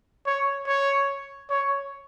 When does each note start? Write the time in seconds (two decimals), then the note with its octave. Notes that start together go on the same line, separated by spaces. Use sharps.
0.26 C#5
0.67 C#5
1.50 C#5